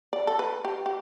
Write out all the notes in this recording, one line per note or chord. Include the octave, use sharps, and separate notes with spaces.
D5
A4
B4
G4
G4